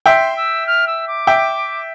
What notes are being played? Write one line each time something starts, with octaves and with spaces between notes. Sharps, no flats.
E5 G5 C6
E6
F6
E6
D6
E5 G5